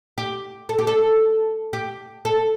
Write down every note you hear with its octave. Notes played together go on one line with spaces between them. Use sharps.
G4
A4
G4
A4
G4
A4